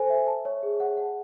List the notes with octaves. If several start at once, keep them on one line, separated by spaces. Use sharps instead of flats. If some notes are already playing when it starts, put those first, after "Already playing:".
Already playing: A4 C5 G#5
E5
A5
C#5
G#4
F#5
F#5